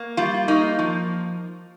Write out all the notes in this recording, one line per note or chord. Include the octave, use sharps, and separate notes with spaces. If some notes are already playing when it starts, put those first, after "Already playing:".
Already playing: A#3
G3 F4
A#3 D#4
F3